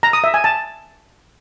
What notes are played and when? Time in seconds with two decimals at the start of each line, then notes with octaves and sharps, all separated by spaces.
0.03 A#5
0.13 D#6
0.24 E5
0.34 G#5
0.44 A5